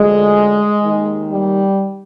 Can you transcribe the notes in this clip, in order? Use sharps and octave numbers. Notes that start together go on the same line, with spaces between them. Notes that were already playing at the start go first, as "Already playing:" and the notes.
Already playing: D2 D3 F3 G#3
D#2 D#3
G3